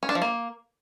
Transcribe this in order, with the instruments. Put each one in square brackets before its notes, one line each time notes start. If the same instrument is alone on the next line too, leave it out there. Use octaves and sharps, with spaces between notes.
[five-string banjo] C#4
D4
F3
A#3